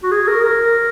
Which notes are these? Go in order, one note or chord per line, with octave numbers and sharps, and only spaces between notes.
F#4
G#4
A#4
A#4